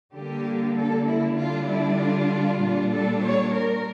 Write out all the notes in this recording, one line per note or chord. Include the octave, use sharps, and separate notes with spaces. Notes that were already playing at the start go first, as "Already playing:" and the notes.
D3 G3 A#3 G4
A4
E4
D3 G3 D4 F4
E4
F4
A#2 G3 D4
A4
C#5
A#4